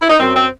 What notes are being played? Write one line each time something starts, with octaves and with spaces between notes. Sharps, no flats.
E4
D#4
F#2 C4
C4